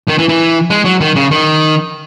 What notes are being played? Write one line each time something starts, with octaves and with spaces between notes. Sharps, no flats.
D#3
E3
E3
G#3
F#3
D#3
C#3
D#3